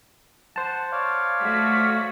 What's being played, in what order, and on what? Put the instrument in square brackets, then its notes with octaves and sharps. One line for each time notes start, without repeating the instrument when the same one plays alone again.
[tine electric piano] C5 A5 [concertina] F#5
[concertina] C#5 D5 F5
[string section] A3 F#4 B6